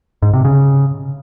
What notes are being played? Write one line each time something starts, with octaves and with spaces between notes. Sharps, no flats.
G#2
C3
C#3